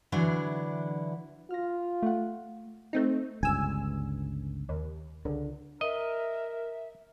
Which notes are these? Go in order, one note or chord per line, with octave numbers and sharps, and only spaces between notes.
D3 E3 F#3 D4 E4
F4 F6 A#6
A3 F#5
A3 C4 D#4
G1 C#2 G2 G#5 E6
D#2
C#2 D3
A#4 D#5 E5